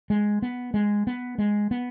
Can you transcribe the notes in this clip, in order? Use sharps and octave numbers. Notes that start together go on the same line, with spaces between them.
G#3
B3
G#3
B3
G#3
B3